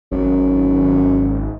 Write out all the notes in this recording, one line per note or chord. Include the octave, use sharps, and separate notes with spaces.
G#1 F#2